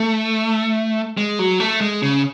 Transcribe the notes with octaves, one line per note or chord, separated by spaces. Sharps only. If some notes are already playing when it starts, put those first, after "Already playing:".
Already playing: A3
G#3
F#3
A3
G#3
C#3